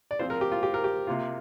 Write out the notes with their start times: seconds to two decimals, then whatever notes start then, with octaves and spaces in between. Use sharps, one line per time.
0.11 D5
0.19 F3 C4 F4 C5
0.30 A#4
0.41 G4
0.52 F4
0.63 G4
0.74 A#4
0.84 G4
1.07 C3 A#3 F4